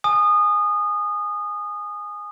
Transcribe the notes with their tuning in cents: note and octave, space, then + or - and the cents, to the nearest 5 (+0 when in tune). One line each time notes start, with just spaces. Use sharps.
G#5 +0 D#6 -25